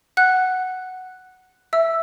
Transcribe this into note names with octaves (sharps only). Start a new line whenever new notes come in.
F#5 F#6
E5 E6